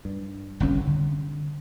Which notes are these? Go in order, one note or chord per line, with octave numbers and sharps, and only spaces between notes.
G2
G1 C2 F2 C#4
D3